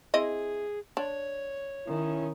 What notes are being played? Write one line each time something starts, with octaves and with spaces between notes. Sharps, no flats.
C4 E4 G#4 D#5
D4 C#5
D#3 C#4 E4